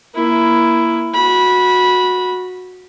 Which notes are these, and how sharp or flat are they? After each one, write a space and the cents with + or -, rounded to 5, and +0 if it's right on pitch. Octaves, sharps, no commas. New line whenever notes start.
A#3 +20 E4 +10
F#4 -15 B5 -15